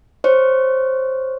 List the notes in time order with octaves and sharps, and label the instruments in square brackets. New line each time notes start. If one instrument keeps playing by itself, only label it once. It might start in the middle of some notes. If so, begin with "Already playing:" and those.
[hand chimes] C5 C#5